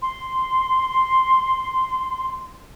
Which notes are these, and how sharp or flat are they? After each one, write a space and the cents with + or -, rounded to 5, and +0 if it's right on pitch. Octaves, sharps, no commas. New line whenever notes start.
C6 -5